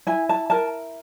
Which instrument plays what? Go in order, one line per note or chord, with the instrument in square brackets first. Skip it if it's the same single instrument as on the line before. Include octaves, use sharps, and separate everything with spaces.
[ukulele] E4 G#5
A5
A#4 A5